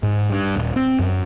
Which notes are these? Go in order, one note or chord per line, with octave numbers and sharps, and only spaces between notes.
G#2
G2
D#1
C4
F#2